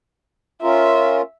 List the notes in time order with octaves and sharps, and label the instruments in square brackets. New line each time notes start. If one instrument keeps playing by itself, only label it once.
[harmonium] C#4 F4 A#4 [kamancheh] E5